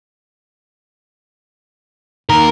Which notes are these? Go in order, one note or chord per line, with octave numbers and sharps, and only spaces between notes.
D#3 A#3 A#4